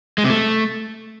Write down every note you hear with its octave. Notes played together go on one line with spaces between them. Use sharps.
G#3
C3
A3